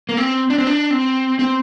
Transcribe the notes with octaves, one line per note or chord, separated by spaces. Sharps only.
A#3
C4
D4
C4
D4
C4
C4